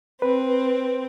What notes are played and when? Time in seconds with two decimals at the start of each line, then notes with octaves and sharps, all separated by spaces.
0.22 C4 B4